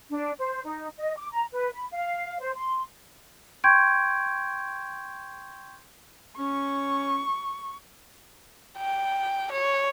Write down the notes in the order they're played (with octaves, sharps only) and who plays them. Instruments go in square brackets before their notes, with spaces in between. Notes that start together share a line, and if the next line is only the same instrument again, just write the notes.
[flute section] D4
C5
D#4
D#5
D6
A#5
B4
B5
F5
C5
C6
[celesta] G5 C6 C#6 G6 G#6 D7
[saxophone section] C#4 [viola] C#6
[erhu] G5
C#5